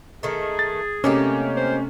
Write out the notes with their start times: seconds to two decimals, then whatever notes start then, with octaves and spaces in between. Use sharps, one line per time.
0.23 D#3 A3 G#4
0.59 A6
1.04 C3 A3 A#3 C#4 D#4 G4
1.56 C5